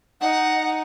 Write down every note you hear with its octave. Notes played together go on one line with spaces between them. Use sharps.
D#4 F#5